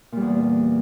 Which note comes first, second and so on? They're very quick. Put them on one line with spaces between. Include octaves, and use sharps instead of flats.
A#2 G3 E2